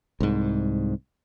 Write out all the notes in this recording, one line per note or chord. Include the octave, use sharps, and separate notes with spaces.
C2 G#2